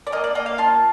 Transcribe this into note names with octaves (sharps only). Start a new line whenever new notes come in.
D5
A#3 D#5
D5
A#3 D#5
F5
F4 A5